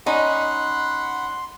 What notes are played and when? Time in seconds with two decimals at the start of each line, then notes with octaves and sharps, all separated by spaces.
0.06 C#4 D#4 F#5 B5 C6